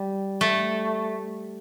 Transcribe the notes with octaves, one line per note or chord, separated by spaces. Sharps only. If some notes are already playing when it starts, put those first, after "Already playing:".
Already playing: G3
A3